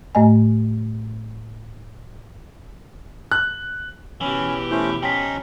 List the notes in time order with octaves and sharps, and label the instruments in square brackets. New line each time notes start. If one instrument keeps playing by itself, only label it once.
[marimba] A2 A3 D#5 G#5
[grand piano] F#6
[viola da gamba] B2 G4 [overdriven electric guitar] E3 [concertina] C#4
[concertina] A3 C#4 C5 [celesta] E4
[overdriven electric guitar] F3 D#4 [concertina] C#4 [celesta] G5 B6